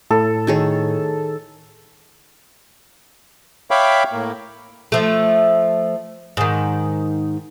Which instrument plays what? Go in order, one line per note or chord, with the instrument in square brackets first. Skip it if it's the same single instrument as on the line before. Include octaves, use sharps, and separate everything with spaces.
[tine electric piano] A2 [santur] A4
[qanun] D#3 G#4 C#5
[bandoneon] C#5 E5 F5 G5 B5 D6
A2 A#3
[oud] F3 A3
G#2 D#3